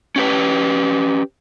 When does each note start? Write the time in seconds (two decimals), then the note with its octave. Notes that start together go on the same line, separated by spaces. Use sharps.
0.16 C#4 G4 B4